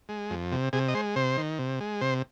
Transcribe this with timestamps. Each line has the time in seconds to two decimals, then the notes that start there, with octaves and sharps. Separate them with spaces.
0.09 G#3
0.30 F2
0.52 C3
0.73 C3 G#4
0.88 D#5
0.94 G#3 C5
1.16 C3 C5
1.37 D#3
1.59 C3
1.80 G#3
2.01 C3 C5